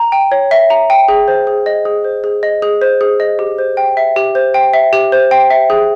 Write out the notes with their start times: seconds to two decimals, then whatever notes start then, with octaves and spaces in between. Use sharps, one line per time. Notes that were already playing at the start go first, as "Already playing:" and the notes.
Already playing: A#5
0.12 G5
0.32 C#5
0.51 E5
0.70 A#5
0.90 G5
1.08 G#4
1.28 C5
1.47 G#4
1.66 D#5
1.85 G#4
2.04 C5
2.24 G#4
2.43 D#5
2.62 G#4
2.82 C5
3.01 G#4
3.20 D#5
3.39 G4
3.58 C5
3.77 G5
3.97 E5
4.16 G4
4.35 C5
4.54 G5
4.74 E5
4.93 G4
5.12 C5
5.31 G5
5.50 E5
5.70 G#4